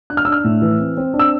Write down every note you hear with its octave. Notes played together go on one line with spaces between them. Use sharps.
D4 F#6
F6
D4 E6
F6
A2
E3
C4
C4
D4
E6